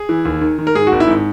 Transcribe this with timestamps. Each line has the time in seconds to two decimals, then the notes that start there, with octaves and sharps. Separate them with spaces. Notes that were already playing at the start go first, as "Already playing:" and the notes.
Already playing: G#4
0.09 E3
0.25 D#2
0.41 D#3
0.58 D#3
0.67 A#4
0.75 G#2 G#4
0.87 F#4
0.92 G#1
1.00 E4
1.08 G#2